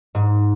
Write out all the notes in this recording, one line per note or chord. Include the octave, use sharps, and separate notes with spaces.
G#2